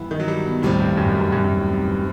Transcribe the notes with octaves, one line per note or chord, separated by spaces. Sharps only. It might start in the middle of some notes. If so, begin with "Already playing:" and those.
Already playing: G2 E3 B3 E4
D#3
F#3
G3
B2
D#2 A2 D#3 G3 C4
G2
F#2
F#2
G2
F#2
F#2
A2
C3
E3